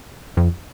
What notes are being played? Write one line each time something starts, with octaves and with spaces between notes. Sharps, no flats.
F2